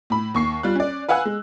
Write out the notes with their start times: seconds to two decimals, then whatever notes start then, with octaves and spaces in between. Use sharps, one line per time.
0.10 A2 B5
0.35 D#2 C#6 C7
0.63 G3 F4 F#6
0.75 C#4 D5
1.09 B4 F5 F#5 G#5 E6 F#6
1.25 G#3